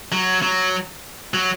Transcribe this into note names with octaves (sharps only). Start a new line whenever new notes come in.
F#3
F#3
F#3